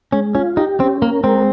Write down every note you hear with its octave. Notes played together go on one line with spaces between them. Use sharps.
G#3 C#4
C#4 F4
D#4 G4
C4 C#4
A#3 A#4
G#3 C4